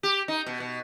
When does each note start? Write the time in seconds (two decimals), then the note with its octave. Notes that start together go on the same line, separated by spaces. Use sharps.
0.03 G4
0.28 D#4
0.46 B2
0.60 B2